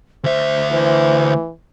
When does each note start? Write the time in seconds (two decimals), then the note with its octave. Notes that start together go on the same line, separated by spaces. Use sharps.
0.24 D2 C5 E5
0.72 E3 C5